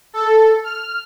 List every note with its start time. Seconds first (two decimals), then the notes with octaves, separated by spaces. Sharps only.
0.14 A4
0.64 F6